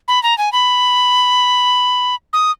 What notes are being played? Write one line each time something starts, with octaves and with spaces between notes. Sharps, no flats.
B5
A#5
G#5
B5
D#6